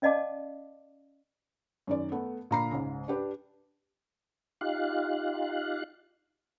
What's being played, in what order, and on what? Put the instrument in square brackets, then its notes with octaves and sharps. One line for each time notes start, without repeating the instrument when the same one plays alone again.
[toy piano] C#4 D5 D#5 F5 A5 D6
[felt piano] F#2 D#3 D5
A3 B3
A#2 D3 A#5 B5 C7
C#2 G#2 C#3
D4 G4 B4
[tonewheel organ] D#4 F4 G4 F5 F#6